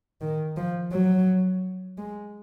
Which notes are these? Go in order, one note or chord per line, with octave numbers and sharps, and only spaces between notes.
D#3
F3
F#3
G#3